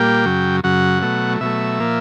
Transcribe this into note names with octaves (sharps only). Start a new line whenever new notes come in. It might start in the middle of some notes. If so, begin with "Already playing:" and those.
Already playing: A#2 G3 A#3 G5
F#2 C#3 F#3
F#2 C#3 F#3 F#5
B2 F#3 A3
B2 F#3 A3 E5
A#2 F3 A#3